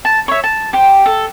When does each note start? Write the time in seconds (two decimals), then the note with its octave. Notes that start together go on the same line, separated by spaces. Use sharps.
0.05 A5
0.28 C#5 E5
0.44 A5
0.73 G4 C5
1.06 A4